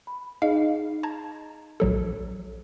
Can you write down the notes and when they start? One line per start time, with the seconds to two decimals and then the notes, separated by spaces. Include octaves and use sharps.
0.07 B5
0.42 D#4 G#4 D#5 F5
1.03 A5 A#5 G#6
1.80 A#1 F#3 A4